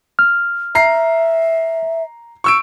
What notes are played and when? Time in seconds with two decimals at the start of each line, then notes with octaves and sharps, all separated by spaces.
0.19 F6
0.75 E5 A#5 C7
2.44 C#6 E6 D7